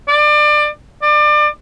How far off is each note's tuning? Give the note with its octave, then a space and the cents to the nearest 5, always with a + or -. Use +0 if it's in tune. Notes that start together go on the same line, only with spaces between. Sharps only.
D5 +25
D5 +30